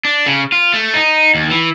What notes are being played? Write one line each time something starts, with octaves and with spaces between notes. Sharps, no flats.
D4
C#3
F4
A3
D#4
D#2
E3